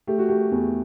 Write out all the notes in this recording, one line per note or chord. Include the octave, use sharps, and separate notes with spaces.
A3 G4
F#4
A3 G4
E2